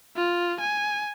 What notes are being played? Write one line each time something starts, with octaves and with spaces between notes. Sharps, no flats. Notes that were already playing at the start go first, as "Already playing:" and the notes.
F4
G#5